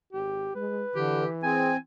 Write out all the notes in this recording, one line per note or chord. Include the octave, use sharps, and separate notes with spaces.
G#1 G4
G#3 B4
D3 E3 G4
C4 G#4 G#5